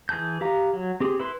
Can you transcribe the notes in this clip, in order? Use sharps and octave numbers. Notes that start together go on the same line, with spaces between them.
E3 G#4 A5 G6
G4 F5 A#5
F#3
C4 G4 G#4
E4 B4 C6